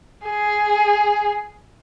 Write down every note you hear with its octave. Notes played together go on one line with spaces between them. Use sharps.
G#4